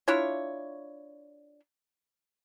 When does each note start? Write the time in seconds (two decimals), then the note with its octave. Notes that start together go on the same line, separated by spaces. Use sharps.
0.08 D4 E4 F4 C#5